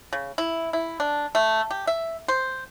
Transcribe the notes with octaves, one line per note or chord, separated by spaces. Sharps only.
C#3
E4
E4
D4
A3
G4
E5
C5